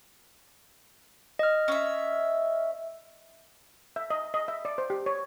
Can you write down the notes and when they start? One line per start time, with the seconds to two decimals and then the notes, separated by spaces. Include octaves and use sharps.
1.39 D#5 F6
1.68 C#4 E5
3.96 E5
4.10 D#5
4.34 D#5
4.48 E5
4.65 D5
4.78 C5
4.90 G4
5.06 C#5